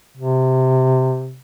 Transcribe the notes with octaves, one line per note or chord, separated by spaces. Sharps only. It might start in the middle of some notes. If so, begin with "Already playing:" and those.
C3